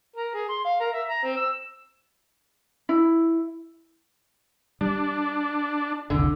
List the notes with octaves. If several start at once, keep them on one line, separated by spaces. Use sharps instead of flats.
A#4
G#4
C6
F5
A#4
E5
A#5
C4
E6
E4
G3 D4
F1 C2 D3